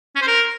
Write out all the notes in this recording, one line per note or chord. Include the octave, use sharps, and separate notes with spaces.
C#4
C5
A#4